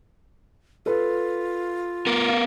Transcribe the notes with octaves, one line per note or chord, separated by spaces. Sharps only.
F4 A4 B4
B3 A#4
F5